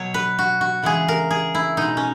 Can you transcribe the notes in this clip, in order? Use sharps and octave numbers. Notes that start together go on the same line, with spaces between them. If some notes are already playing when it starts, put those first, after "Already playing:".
Already playing: B2 F#3 C#5
B4
F#4
F#4
C#3 E3 G#3 G#4
A#4
G#4
E4
B2 G#3 D#4
C#4